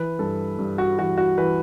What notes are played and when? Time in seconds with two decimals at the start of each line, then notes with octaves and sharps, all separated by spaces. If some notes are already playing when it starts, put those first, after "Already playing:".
Already playing: E3 B4
0.19 G2 A4
0.59 G2
0.78 F#4
0.98 E3 F#4
1.18 F#4
1.38 E3 B4